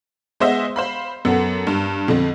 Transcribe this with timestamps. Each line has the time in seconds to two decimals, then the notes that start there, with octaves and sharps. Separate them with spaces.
0.40 G#3 B3 C5 D#5 E5
0.76 C5 F5 B5
1.25 F#2 B3 A4
1.67 G2
2.08 F2 D3 C4